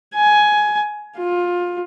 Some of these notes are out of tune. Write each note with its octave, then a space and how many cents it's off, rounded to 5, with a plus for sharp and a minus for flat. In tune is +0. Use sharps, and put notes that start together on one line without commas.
G#5 +15
F4 +20